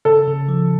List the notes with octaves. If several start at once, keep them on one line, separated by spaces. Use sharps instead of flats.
C#3 A4
C#3
F3